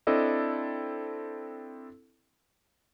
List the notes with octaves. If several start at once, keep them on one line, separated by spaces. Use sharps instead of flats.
C4 D4 E4 A4 D5 D#5